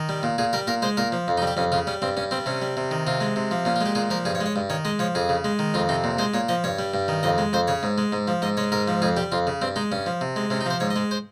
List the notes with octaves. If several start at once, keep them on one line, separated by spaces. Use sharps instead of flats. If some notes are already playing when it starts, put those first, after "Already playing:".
Already playing: D#3
G3
A#2
A#2 G#4
G3 A#4
A#2 A#4
G#3 C5
A#2 A#4
F3
F2
D#4
G3
G4
F2 C#4
C#3 F4
G3 C#4
G2 C4
G2 C#4
G3 C4
C3 C#4
G3
C3
D#3
C3 F4
G#3
C3
F3
A#2 C#4
F4
G#3 G4
A#2 G#4
F3 A#4
G2 G#4
C#5
G#3
C#5
G2
D#3 C#5
G#3 D#5
F3 C#5
F2 G#4
C#3
G#3
D#3
F2 F4
C3 D#4
A#2
G#3 C5
A#2 C#5
F3 D#5
G2 C#5
G3
G2
D#3
F2 D#5
G#3
F2 C5
C#3 C#5
G#2
G#3
G#2
F3
G#2 D#5
G#3 C#5
G#2 A#4
F3
F2 G#4
G3 G4
F2 F4
C#3
G2 C4
G#3 D#4
G2 C#4
F3
C3
G#3
C3 C#4
D#4
F3 C5
G#2 C#5
D#5
G#3
C5